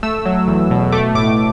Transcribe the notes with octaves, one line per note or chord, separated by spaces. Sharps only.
A3 E6
F#3
E2
B2
A3 D6
A2 D6